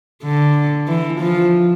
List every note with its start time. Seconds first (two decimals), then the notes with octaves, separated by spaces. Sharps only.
0.24 D3
0.88 E3
1.20 F3